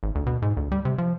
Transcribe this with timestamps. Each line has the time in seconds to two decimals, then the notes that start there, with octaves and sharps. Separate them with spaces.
0.03 G#1
0.15 D2
0.27 B2
0.42 G#2
0.57 D2
0.72 G3
0.85 C3
0.98 F3